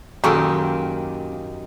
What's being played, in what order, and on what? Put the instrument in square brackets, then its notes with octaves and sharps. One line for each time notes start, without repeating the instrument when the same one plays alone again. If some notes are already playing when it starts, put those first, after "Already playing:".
[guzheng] F#2 D#3 G4 [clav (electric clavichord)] A#2 [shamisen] F#3 A4